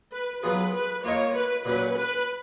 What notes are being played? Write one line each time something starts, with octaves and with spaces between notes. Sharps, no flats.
B4
F#3 B3 F4 G#4 B4
B4
A#3 F4 A#4 C#5 D#5
B4
A#2 F#3 C#4 B4
B4